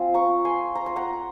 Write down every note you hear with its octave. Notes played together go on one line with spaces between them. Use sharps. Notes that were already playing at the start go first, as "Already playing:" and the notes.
Already playing: F3 C4 F4 G#5
A#5 C#6
G#5 C6
A#5
C6
F#5 A#5